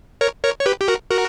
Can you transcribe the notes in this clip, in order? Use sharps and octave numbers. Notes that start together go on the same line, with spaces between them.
A#4 C#5
A#4 C#5
C#5
G4 B4
G4
F#4 A#4
F#4 A#4